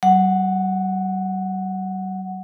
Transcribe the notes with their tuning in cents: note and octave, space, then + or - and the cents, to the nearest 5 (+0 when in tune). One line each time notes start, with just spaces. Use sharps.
G3 -45 F#5 +0